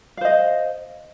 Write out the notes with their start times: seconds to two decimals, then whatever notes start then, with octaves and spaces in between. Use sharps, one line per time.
0.17 F5
0.21 C5
0.25 D#5